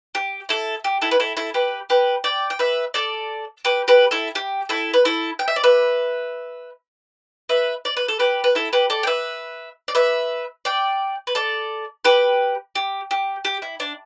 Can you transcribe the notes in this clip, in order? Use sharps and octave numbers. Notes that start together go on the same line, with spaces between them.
G4
E4 A4
G4
E4 A4
B4
E4 A4
E4 A4
G4 B4
G4 B4
D5 G5
G5
B4 E5
A4 D5
G4 B4
G4 B4
E4 A4
G4
E4 A4
B4
E4 A4
G5
E5
D5
B4 E5
B4 E5
D5
B4
A4
G4 B4
B4
E4 A4
G4 B4
A4 D5
G5
B4 E5
D5
B4 E5
D5 G5
B4
A4 D5
G4 B4
G4
G4
G4
E4
D4